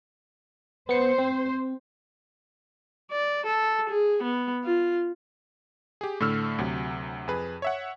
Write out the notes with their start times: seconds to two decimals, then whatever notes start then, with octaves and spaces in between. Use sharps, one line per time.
0.89 B3 C5 C#7
1.18 C4
3.11 D5
3.46 A4
3.89 G#4
4.23 B3
4.64 F4
6.01 G4 G#4
6.20 A2 D3 A3 E6 F6
6.58 D2 C3 F#3
7.28 F2 G#4 B4
7.62 C#5 E5 F#5